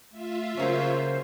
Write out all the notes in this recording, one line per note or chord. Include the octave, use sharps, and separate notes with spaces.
A3 F4 E5
C#3 F#3 A#3 C#4 C5